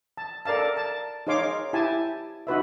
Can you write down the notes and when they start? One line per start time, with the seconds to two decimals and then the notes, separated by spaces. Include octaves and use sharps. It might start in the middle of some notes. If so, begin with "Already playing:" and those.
0.17 A5
0.45 A4 A#4 D5 F5 A5
0.77 A5
1.27 D#4 G#4 C#5 F5 C6 D6
1.73 E4 G4 G#5 A5
2.47 D#4 F#4 B4 E5